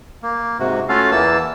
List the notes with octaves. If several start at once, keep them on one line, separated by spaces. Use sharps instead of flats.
A#3
G#2 C3 F#4
A3 C#4 F4 F#4 A4 F5
E2 E3 A#3 A5 E6